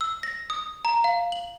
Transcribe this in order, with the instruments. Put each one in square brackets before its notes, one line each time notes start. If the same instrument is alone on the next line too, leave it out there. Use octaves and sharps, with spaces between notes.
[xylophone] E6
A#6
D#6
A#5
F5
F#7